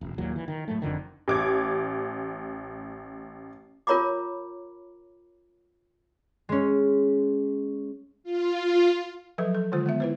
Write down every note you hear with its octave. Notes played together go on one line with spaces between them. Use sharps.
E1
D#2 A#2 F#3
E3
D#3
A2 F#3 A3
F#1 F2 D3 D#3
A1 D6 G#6
F4 A#4 C#5 A#5 B5 D6
G#3 C#4
F4
F3 F#3 A4 B4 E5
A4
D3 D#3 G#3 F4 C5
G#3 B3 E5
E4 B4 C5